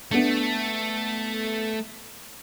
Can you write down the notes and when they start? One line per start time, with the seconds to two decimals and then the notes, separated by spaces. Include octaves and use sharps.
0.11 A3 B3 D4